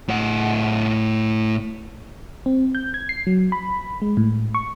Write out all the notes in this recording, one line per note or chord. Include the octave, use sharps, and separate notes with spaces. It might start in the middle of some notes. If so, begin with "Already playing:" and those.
A2 F#5
C4
G6
G#6
C7
F#3
B5
G#3
A2
C#6